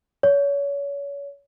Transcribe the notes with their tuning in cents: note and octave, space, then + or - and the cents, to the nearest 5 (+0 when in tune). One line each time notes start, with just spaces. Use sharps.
C#5 +30